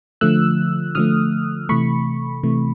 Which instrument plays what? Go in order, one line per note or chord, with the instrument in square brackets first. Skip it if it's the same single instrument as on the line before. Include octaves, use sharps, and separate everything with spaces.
[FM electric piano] D3 F3 A3 E6 F#6
D3 F3 A3 D#6 F6
C3 E3 A3 B5 C#6
C3 E3 A3